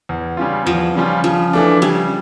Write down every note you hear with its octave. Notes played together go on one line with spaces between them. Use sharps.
E2
C#3 G3 C#4 F4
E2 F3
C#3 G3 C#4 F4
C#3 F3
E3 A3 D4
C#3 G3